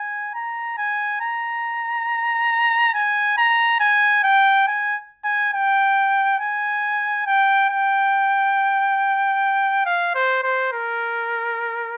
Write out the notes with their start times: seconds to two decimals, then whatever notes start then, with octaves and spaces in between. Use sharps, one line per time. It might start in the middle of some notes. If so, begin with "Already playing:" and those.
Already playing: G#5
0.35 A#5
0.78 G#5
1.21 A#5
2.94 G#5
3.38 A#5
3.80 G#5
4.24 G5
4.67 G#5
5.25 G#5
5.54 G5
6.40 G#5
7.26 G5
7.70 G5
9.86 F5
10.15 C5
10.43 C5
10.72 A#4